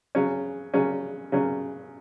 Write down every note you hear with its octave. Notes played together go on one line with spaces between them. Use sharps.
C#3 F#3 C#4
C#3 F#3 C#4
C#3 F#3 C#4